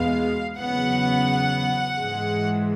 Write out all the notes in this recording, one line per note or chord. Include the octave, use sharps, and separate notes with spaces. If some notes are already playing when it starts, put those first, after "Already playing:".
Already playing: E2 B2 G#3 B3 F5
E2 C#3 F#3 B3 F#5
G#2 E3 G#3